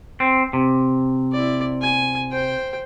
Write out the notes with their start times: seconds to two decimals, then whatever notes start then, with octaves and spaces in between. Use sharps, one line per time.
0.20 C4
0.53 C3
1.32 E4 D5
1.81 G#5
2.31 C5 G5